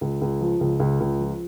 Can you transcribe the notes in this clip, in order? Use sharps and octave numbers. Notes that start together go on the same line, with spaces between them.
C#2
C#2
F3
C#2
C#2
C#2
F3